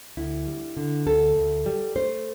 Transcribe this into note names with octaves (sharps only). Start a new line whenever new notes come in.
D2 E4
G3
D3
D2 A4
D2
G3
A3 C5